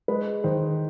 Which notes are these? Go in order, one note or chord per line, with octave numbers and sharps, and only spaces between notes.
G#3 B4
D#3 C5